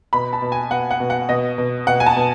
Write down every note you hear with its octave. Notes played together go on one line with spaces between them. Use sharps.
B2 B5
A5
B2
G#5
B2 F#5
F#5
B2
F#5
B2 D#5
B2
B2 F#5
G#5
A5
B2